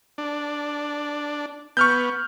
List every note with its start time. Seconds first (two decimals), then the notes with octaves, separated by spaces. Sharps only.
0.18 D4
1.77 B3 C#6 F6 G6